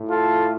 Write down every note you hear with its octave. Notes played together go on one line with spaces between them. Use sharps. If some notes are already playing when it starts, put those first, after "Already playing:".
Already playing: A2
F4 A4